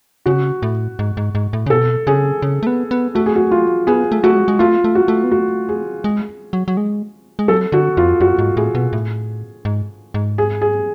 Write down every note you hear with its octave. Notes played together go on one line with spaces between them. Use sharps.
C#3 F#4
A2
G#2
G#2
G#2
A2
C#3
B2 A4
C#3 G#4
C#3
A3
B3
B3
A3 F#4
G#4
F#4
F4
B3 G#4
A3
A3 F#4
G#3
G#3
A3 F4
A3
F#4
A3
B3
A3 F#4
G#4
G#3
F#3
F#3
G#3
G#3
F#3 A4
D3 F#4
F2 F4
F#2 F#4
G#2
A2 G#4
B2
A2
G#2
G#2
G#4
G#4